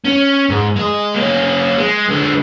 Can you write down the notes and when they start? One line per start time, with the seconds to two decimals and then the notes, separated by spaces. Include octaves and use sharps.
0.05 C#4
0.50 G#2
0.76 G#3 D#5
1.14 A#3 C#4
1.78 G#3
2.08 D3 G#3